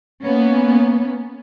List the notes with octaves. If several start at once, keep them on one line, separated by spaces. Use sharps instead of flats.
A#3 B3 C#4